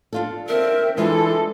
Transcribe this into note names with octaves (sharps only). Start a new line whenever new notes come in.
D4 F4 A4
C4 A#4 E5
E3 G#3 D4 F4 A4 B4 E5